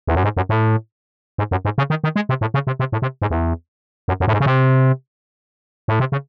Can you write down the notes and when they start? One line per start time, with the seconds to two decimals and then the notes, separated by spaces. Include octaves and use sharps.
0.07 E2
0.15 F#2
0.24 G#2
0.37 F#2
0.49 A2
1.38 G#2
1.51 F#2
1.65 G#2
1.78 C#3
1.90 D#3
2.04 D#3
2.16 G#3
2.29 C3
2.41 A2
2.54 C#3
2.67 C3
2.80 C3
2.92 A2
3.02 C3
3.22 G#2
3.30 E2
4.08 F#2
4.20 F#2
4.28 A2
4.33 G#2
4.40 C#3
4.46 C3
5.88 A2
6.00 C3
6.12 C#3